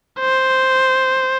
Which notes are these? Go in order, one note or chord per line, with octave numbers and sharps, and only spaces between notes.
C5